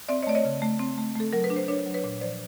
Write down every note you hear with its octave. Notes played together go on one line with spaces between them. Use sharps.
C4 D5 E5
C#5 D#5
A3 D5
C#5 D#5
C#3
A3
C4
A3
A3 A4
F#3 A#4
B4
D4
C5
D4 B4 C#5
F#3
B4 C#5
A#2
F3 C5 D5